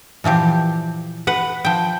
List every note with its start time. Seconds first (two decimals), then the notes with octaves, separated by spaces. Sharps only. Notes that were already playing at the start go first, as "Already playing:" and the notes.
0.24 A#2 E3 F3 G4
1.27 B4 F#5
1.65 F3 G5